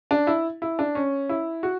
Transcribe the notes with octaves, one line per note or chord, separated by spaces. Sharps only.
D4
E4
E4
D4
C#4
E4
F#4